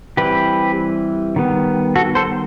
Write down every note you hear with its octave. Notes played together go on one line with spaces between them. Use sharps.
E3 G3 C4 G4 B4
D#3 G3 B3
F#4 A4
A4 C5